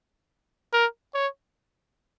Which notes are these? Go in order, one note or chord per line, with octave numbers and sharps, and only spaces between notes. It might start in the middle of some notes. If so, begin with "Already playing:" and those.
A#4
C#5